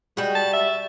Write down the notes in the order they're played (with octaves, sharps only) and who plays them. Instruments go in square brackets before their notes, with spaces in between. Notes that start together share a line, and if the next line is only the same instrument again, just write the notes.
[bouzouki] G3 F#4 [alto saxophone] G#3
[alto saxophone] A5
E5